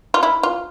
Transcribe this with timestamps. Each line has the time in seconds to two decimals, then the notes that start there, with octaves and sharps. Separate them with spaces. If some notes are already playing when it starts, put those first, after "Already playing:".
0.14 F4
0.23 E4
0.43 F4